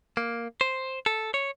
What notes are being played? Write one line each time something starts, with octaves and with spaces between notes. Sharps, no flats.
A#3
C5
A4
C#5